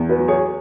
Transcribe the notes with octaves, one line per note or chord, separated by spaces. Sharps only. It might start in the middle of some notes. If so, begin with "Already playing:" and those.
Already playing: E2
F#4 B4
F#3
G#4 C#5